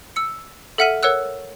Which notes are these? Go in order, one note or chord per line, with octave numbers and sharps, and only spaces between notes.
E6 C#7
A4 E5 F#5 F6 B6 D#7
A#4 C#5 F#5 E6 F#6